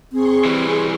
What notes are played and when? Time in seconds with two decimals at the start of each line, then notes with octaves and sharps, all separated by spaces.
0.13 C4 G#4 C6 C#6
0.45 E3 G3